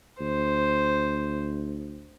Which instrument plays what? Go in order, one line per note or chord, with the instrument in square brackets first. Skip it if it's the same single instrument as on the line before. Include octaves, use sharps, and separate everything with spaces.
[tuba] D2 [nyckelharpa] C5